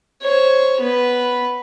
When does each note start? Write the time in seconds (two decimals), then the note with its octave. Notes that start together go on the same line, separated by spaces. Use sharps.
0.22 C5 C#5
0.81 B3 B4